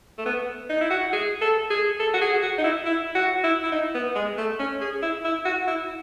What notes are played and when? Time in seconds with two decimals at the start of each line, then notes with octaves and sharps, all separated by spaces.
0.19 A3
0.26 B3
0.70 D#4
0.81 E4
0.91 F#4
1.13 G#4
1.41 A4
1.70 G#4
2.00 A4
2.14 F#4
2.21 G#4
2.43 F#4
2.58 D#4
2.64 E4
2.86 E4
3.15 F#4
3.44 E4
3.63 E4
3.72 D#4
3.95 B3
4.16 G#3
4.38 A3
4.60 C#4
4.81 G#4
5.03 E4
5.25 E4
5.45 F#4
5.67 E4